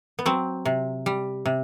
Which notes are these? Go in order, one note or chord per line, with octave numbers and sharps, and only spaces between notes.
B3
F#3 C4
C3
G3
C3